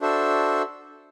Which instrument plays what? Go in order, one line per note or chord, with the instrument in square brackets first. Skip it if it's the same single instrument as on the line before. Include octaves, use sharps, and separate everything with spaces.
[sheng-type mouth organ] D4 F#4 A4 C5 E5